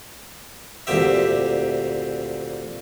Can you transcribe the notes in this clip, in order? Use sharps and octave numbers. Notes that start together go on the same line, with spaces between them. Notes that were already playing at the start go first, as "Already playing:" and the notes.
D2 A#2 C4 G4 E5